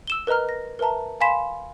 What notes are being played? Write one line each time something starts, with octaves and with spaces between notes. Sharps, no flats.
E6 E7 G7
A#4 B4 D#5 A#5 F6
A#6
A#4 B4 E5 A5 A#5
F5 G#5 B5 C6 B6 E7